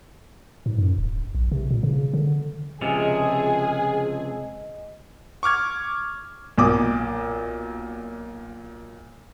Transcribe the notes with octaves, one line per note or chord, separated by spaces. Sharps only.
G#2
F#2
D1
A#1
C3
A#2
C#3
D3
C#2 C3 F3 G#4 D#5
C#6 D6 F6 G#6
B1 A#2 G#5 D6 D#6